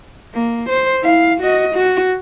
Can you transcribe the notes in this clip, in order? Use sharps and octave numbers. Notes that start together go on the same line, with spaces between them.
A#3
C5
E4 F5
F#4 D#5
F#4